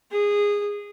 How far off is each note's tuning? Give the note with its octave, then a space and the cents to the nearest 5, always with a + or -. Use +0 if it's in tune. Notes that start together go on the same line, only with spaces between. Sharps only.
G#4 -15